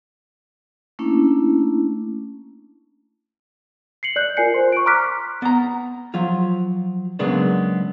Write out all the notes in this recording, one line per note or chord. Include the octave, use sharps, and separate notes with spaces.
A3 A#3 C#4 D4 E4
C7 C#7 F#7
D5 F#6 G6
F4 A#4 D5 G#5 C7 C#7
C5 C6
C#6 D7
A#5 C6 D6 F6 F#6 B6
B3 A#5
F3 F#3 F4
C#3 F#3 G#3 A#3 B3 D4